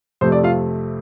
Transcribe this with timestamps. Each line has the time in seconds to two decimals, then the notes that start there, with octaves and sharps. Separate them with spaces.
0.21 F2 C3 A3 C5
0.32 D5
0.43 F4 F5